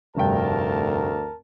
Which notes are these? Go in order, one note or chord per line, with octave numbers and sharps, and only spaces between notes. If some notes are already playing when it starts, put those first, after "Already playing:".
F1 D2 G2 A#4 G5 A5